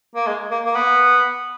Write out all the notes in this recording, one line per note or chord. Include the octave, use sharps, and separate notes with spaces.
A#3
G#3
A#3
A#3
B3